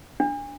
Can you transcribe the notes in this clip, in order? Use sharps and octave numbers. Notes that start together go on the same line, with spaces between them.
D4